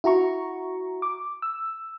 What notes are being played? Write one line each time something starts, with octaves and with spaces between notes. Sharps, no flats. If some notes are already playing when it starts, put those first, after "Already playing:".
E4 F#4 A#5 C#6
D6
E6